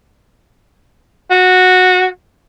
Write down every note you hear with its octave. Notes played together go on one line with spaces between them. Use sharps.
F#4